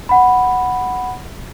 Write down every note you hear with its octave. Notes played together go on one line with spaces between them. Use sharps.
F#5 B5